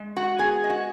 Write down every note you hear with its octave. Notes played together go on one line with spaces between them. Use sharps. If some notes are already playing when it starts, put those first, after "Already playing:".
Already playing: G#3
F#4 F#5
B3 G#4 G#5
D#5
F#4 F#5